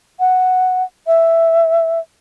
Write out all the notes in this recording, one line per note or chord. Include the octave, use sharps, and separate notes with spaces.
F#5
E5